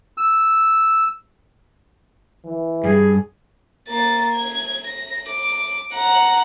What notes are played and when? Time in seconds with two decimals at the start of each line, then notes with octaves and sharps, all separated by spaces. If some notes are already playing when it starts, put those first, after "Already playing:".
0.18 E6
2.45 E3
2.84 G2 G#4
3.89 A#3 A6
4.34 G#6
4.87 A#6
5.29 D6
5.94 F#5 A#5